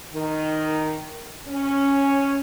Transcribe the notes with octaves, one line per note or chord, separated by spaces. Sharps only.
D#3
C#4